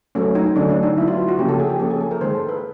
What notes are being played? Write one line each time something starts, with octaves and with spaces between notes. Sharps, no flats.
F#3 A3 C#4
D#4
D3 F#3 A3 C#4 D4
D4
D#4
F#3 B3 E4
F4
F#4
F#4
C#3 F3 A#3 C#4 G4
A4
G#4
G4
F3 A#3 C#4 A4
G#4
A4
A#4
D#3 G#3 B3 C5
A4
B4